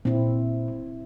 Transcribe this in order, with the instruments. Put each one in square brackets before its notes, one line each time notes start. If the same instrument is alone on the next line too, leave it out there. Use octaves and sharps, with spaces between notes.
[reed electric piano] A#2 [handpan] C4 E4